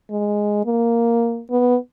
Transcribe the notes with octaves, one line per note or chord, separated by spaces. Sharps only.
G#3
A#3
B3